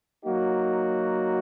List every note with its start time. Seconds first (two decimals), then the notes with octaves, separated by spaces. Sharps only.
0.24 F#3 A#3 D#4 F#4